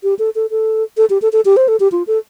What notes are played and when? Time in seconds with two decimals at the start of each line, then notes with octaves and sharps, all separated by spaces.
0.03 G4
0.19 A4
0.35 A4
0.51 A4
0.97 A4
1.10 G4
1.22 A4
1.33 A4
1.45 G4
1.57 C5
1.68 A4
1.80 G4
1.92 F4
2.07 A4